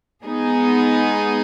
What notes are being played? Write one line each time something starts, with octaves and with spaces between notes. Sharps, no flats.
G#3 B3 D#4 G#4